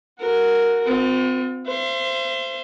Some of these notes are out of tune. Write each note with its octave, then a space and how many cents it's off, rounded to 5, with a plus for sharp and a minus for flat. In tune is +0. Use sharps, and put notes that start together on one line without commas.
F#4 -15 A#4 +0
C4 -30 F4 +40
C5 +0 E5 +45